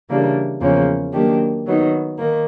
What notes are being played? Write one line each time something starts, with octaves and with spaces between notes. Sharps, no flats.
C#3 E3 G3 A#3 D4
E2 C#3 F3 A#3 C#4
D#3 F#3 A#3 D4 G4
D#3 F#3 B3 D#4
D#3 A#3